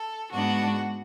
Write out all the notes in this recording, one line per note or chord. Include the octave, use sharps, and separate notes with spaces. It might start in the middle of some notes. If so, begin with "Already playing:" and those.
Already playing: A4
G#2 G#3 B3 D4 F#4